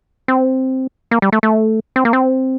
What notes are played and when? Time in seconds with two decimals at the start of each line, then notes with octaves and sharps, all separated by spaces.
0.28 C4
1.11 A#3
1.22 G3
1.32 A3
1.43 A3
1.96 C4
2.05 A#3
2.13 C4